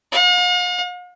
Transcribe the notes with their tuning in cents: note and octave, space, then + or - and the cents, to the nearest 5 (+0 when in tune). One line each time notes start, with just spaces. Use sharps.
F5 +45